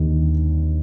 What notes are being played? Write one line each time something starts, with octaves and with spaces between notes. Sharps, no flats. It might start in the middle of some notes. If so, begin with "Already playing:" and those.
Already playing: D#2 D#3